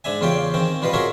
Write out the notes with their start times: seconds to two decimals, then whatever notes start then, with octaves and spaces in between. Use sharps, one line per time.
0.04 G#2 D4 E5 G#5
0.21 E2 C#3 F4 G4 C#5 G5
0.54 D#3 C4 C#4
0.82 G3 F4 B4 D#5 F5
0.93 F4 F#4 G#4 A#4 C#5 E5